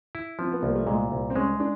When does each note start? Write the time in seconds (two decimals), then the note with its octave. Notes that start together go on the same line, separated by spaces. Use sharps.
0.15 E4
0.39 F3 C4
0.52 B3
0.63 C2 A#3
0.75 A3
0.87 A#2 G#3
1.12 C2
1.30 C4
1.36 G#3 C#4
1.60 D4